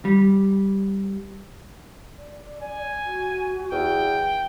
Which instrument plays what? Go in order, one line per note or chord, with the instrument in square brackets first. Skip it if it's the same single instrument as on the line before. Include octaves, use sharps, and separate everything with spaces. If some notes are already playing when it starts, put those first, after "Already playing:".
[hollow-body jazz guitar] G3
[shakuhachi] D5
[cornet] G#5
[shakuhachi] F#4
[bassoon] E2 [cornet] G5